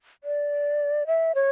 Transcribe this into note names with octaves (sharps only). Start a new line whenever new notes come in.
D5
E5
C#5